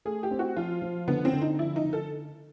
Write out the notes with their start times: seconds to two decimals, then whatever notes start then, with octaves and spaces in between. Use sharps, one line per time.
0.05 A3 G#4
0.23 G4
0.31 C4
0.39 F#4
0.57 F3 F4
0.82 F3
1.08 D3 B3
1.25 C4
1.33 D3
1.42 D#4
1.59 F3 E4
1.76 D#4
1.85 D3
1.93 A4